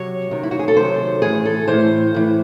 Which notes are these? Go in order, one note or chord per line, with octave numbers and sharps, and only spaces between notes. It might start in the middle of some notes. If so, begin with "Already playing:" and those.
Already playing: C3 F#3 C#5
C3 D#3 F#3
E4
F#4
G#4
A4
C3 D#3 F#3 C5
A2 E3 G#4
A4
A2 E3 C5
A2 E3